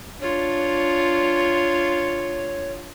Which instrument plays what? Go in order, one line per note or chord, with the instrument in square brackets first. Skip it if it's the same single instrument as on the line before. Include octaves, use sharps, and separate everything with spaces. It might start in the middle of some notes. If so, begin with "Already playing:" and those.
[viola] D4 F4 [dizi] C#5